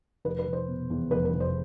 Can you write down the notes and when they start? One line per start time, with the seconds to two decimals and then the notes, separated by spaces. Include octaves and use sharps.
0.25 F1 B4
0.39 B4
0.47 F1
0.53 C5
0.68 B2
0.90 E2
1.11 F1 B4
1.25 B4
1.33 F1
1.40 C5